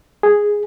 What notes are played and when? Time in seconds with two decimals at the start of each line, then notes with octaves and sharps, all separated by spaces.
0.23 G#4